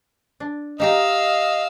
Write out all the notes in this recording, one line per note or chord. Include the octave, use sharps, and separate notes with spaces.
D4
D#4 G4 D#5 F5 A#5 E6